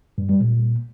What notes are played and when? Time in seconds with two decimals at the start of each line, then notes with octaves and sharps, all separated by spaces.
0.18 G2
0.29 G3
0.41 A#2